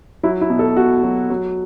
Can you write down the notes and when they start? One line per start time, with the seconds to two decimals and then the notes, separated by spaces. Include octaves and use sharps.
0.23 F#3 E4
0.41 E4
0.50 B2
0.59 A4
0.77 B2 F#4
1.03 F#3
1.30 F#3